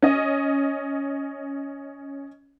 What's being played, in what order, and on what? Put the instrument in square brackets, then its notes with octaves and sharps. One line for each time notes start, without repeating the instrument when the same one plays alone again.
[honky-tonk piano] C#4 D#5